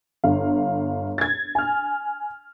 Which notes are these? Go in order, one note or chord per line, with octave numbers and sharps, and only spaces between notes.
G1 F5
G#6 A6
G#5 F6